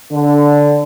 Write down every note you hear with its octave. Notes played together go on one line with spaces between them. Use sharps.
D3